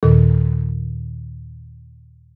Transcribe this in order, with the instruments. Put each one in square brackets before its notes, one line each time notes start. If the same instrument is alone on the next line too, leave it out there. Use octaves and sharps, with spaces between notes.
[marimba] D#2 A#2 D#3 A4